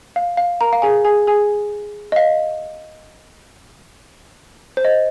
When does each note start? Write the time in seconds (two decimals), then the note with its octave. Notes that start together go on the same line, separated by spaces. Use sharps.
0.16 F5
0.37 F5
0.61 A#4 A#5
0.73 F5
0.82 G#4 G#5
1.04 G#4 G#5
1.27 G#4 G#5
2.12 D#5
2.16 F5
4.77 C5
4.85 D#5